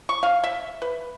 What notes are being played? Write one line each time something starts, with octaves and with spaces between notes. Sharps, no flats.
C#6
F5
E5
B4